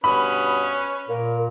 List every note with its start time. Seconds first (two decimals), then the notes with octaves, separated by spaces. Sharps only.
0.04 G2 B2 C#4 B4 B5 D#6
1.09 A#2 A#4